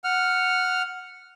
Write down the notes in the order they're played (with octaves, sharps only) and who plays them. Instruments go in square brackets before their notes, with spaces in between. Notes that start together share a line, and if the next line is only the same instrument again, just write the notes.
[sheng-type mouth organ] F#5 F6